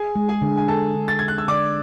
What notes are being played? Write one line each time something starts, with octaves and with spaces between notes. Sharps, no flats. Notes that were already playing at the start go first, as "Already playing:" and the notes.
Already playing: G#4 G#5
G#3
G#4 G#5
D3
G#5
D3 A4 A5
D3
A6
D3 G#6
F#6
E6
D3 D5 D6